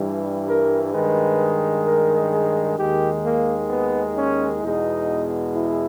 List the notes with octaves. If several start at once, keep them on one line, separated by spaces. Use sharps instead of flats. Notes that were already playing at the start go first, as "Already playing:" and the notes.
Already playing: G2 E3 G3
A#4
G2 D#3 G#3 B4
A#4
G#4
D#2 D#3 G#3 G4
A#3
B3
C#4
E2 B2 G#3 D#4
E4